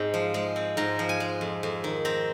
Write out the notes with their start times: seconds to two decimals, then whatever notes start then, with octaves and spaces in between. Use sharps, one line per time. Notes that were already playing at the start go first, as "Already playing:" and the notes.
Already playing: G#2 G#3 C4
0.14 F3
0.34 G#3
0.56 C4
0.77 G#2 A#5
0.99 F3
1.09 G#5
1.20 G#3
1.41 F2
1.63 F2
1.84 D#3
2.05 C4 A#5